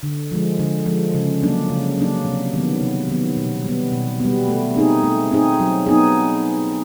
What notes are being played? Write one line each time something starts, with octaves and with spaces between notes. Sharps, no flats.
D3
F3 G#3
D3
F3 G#3
C#3
F#3 A#3 D4
C#3
F#3 A#3 D4
C3
D#3 F#3 B3
C3
D#3 F#3 B3
B2
G3 B3
B2
G3 B3
A3
C4 D#4 G#4
A3
C4 D#4 G#4
F#3
B3 D#4 G#4